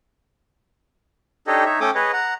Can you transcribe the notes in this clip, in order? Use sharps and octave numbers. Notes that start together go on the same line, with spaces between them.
D4 D#4 G4 A4 C#5 D#5
D#4 C#5 E5
A3 C#4 A4 G5 D6 D#6
G#4 B4 C#5 D#5
F#5 A#5